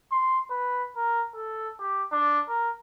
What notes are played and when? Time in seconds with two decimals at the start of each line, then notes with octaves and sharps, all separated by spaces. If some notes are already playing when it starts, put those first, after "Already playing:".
0.12 C6
0.50 B4
0.96 A#4
1.35 A4
1.80 G4
2.12 D4
2.48 A#4